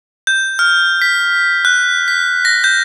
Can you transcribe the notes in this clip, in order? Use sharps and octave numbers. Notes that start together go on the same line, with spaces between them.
G6
F6
B6
F#6
B6
A#6
G6